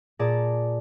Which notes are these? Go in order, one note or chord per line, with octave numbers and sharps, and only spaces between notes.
A#2 G#4 D5 A5 A#5 D6